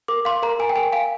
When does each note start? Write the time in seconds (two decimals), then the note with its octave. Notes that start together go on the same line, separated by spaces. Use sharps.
0.08 A#4 D6
0.25 F5 C6
0.42 A#4 A#5
0.59 A#4 G#5
0.69 G5
0.76 A#4 G#5
0.92 F5 G#5